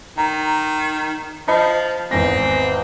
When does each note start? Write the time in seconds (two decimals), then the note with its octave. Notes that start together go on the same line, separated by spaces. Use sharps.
0.18 D#3 A#5
1.48 F3 D#5 A5 B5
2.11 G#1 E2 C4 A#6